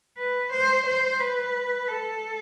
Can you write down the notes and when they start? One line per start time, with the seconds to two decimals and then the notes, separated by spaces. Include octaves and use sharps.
0.18 B4
0.52 C5
0.86 C5
1.20 B4
1.88 A4